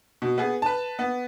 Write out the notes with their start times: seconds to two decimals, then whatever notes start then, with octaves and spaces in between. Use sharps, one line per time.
0.22 B2
0.38 B3 G#4
0.62 B4 A5
0.99 B3